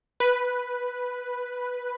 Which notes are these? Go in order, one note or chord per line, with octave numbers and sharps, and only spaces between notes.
B4